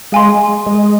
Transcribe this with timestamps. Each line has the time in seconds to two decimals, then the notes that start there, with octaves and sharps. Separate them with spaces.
0.12 G#3 F5 G#5 C6
0.66 G#3